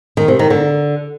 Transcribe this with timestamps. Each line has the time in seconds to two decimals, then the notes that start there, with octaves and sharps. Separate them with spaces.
0.17 D#3
0.28 C3
0.39 D#3
0.50 D3